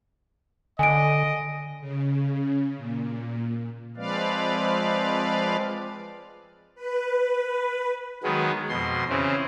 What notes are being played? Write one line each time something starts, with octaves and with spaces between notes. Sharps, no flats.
D3 D#5 G#5 D7
C#3
A#2
F3 G#3 C4 B4 D5 F5
B4
D#3 F#3 G#3 B3
F2 B2 C6
C#3 E3 C4